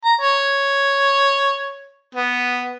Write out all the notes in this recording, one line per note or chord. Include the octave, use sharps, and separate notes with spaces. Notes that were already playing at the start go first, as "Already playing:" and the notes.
A#5
C#5
B3